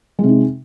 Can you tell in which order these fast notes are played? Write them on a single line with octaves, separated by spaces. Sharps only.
G#3 C3 D#4